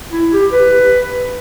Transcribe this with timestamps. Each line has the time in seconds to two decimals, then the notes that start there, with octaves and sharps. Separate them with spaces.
0.12 E4
0.32 G4
0.52 B4